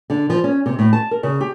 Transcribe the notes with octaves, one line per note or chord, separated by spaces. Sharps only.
D3
F3
C#4
C3
A2
A5
A#4
C#3
G4